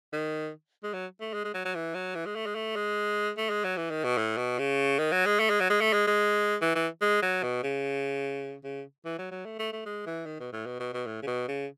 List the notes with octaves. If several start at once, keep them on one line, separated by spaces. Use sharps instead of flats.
D#3
G#3
F#3
A3
G#3
G#3
F#3
F#3
E3
F#3
E3
G#3
A3
G#3
A3
G#3
A3
G#3
F#3
E3
D#3
B2
A2
B2
C#3
D#3
F#3
G#3
A3
G#3
F#3
G#3
A3
G#3
G#3
E3
E3
G#3
F#3
B2
C#3
C#3
E3
F#3
F#3
A3
A3
A3
G#3
E3
D#3
B2
A2
B2
B2
B2
A2
C#3
B2
C#3